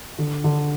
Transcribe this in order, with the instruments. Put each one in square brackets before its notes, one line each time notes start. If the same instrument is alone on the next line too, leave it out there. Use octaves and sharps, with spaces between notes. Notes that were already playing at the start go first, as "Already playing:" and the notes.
[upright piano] D3
D3